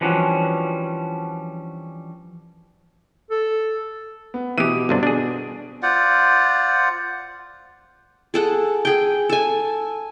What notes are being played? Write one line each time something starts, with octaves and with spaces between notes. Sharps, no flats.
E3 F3 G3 C#4 D4 F#4
A4
B3
B2 E3 G4 D#6 D#7
G1 C3 D4
D4 G#4
F4 C5 D5 F#5
G#4 A4 F#5
G#4 G5
A4 G#5